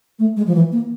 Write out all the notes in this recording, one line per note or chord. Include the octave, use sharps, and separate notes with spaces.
A3
G#3
F3
E3
A#3